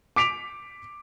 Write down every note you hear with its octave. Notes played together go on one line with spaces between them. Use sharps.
D6 B6 D7 F7